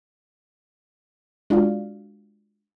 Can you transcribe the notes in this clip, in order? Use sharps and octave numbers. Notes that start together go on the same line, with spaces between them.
G#3 D4 F4 F#4 D5 F5